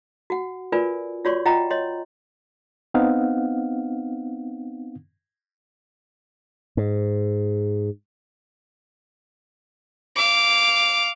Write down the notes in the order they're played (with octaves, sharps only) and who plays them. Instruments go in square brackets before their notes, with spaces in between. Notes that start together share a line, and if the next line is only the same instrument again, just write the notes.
[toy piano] F#4 F#5
F4 A#4 B4 D5 G#5
F4 F#4 C#5 D5 C6 C#6
F4 D#5 F#5 G5 A#5
C#5 D#5 C6
[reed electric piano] B3 C4 D#4 F5 F#5
[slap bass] G#2
[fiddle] F5 D6